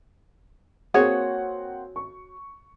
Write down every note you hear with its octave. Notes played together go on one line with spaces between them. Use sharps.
A#3 C4 F#4 G#4 C#5 F#5
C#6